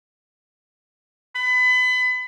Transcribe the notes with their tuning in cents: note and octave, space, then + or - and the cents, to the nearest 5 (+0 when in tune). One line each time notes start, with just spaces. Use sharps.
B5 +30